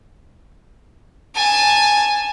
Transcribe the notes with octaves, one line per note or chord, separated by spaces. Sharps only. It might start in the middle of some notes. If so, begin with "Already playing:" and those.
G#5 A5